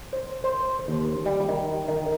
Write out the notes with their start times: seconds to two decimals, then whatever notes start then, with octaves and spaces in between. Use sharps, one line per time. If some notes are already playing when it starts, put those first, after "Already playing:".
0.13 C5
0.44 C5
0.88 D#2
1.26 G3
1.48 D#3
1.88 D#3